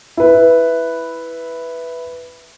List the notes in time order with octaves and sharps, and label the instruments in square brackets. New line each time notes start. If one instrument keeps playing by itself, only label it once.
[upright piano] E4 B4